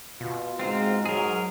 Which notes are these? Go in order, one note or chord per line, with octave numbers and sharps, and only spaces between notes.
B2 F4
G#2 G#3 C4 F4
F#3 G#4 A#4